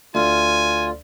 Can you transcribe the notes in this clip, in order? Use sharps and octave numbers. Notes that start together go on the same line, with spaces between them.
D2 F4 G#5